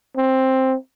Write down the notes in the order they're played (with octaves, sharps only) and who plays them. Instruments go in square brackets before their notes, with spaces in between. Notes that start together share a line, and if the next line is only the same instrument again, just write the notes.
[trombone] C4